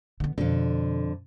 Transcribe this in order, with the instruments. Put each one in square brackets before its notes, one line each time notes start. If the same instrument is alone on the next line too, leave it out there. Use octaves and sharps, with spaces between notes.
[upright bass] D3 B3
[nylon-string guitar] F2 D3 [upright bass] B2